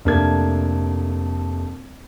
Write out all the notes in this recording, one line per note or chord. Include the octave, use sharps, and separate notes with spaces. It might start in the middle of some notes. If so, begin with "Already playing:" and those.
F1 A3 A#3 D4 G#6